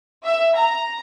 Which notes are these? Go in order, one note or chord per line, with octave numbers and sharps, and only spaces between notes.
E5
A#5